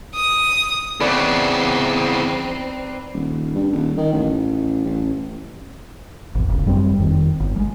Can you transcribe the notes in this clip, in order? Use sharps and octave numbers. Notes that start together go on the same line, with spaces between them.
D#6
E2 C#3 C4 D#4 B4 D5
D#1
G2
D#1
D#3
A1
A1
G#1 E2
D1 G1 C#3
F#2 G3 A3 C4
F1 F2 D#3
G1
G3 G#3